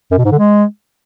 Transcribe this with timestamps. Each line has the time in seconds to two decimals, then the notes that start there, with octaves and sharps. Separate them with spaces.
0.11 F#2
0.18 B2
0.25 G#2
0.32 D3
0.39 G#3